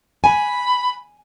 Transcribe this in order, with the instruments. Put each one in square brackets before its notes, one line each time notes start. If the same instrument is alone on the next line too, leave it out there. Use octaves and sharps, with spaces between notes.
[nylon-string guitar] G#5 [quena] B5